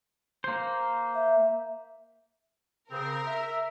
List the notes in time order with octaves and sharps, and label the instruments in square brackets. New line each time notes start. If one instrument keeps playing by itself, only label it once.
[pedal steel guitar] A#3 C5
[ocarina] E5
[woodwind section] C#3 C4 [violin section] A#4
[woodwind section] E5